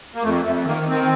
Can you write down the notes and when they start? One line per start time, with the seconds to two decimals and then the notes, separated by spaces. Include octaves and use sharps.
0.15 A#3
0.23 F2 A3
0.45 F2 A3
0.66 D#3 A#3
0.88 D#3 C4